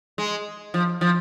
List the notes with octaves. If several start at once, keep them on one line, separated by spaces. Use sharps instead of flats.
G#3
F3
F3